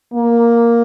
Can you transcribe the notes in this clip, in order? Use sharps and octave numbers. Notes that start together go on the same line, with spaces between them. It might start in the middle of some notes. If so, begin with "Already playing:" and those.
A#3